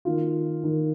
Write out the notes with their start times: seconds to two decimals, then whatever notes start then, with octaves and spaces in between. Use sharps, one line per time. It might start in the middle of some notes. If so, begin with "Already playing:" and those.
0.05 D#3 A#3 F4
0.63 D#3 A#3